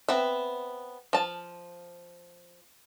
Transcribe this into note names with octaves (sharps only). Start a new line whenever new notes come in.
B3 C4 E5
F3 A5